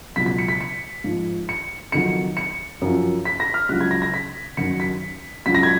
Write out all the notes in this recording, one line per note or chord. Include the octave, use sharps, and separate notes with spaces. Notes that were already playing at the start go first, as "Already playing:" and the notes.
C#2 B2 F#3 B6
B6
C#7
B6
C#7
G#2 F3
C#7
F2 D#3 F#3 C#7
C#7
F#2 F3
B6
A#6
F6
C#2 C#3 F#3 F#6
G#6
A#6
A#6
B6
F#2 D#3 F#3 C#7
B6
C#2 C#3 F#3 B6
A#6
G#6